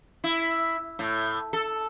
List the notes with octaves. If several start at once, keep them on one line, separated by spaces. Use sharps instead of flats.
E4
A2
A4